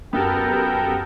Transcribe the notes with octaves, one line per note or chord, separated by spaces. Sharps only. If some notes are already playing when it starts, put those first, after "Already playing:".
F#2 B3 G4 A4 A#4 G5